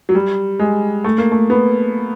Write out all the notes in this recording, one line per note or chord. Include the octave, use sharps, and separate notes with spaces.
F#3
G3
G#3
A3
A#3
A3
B3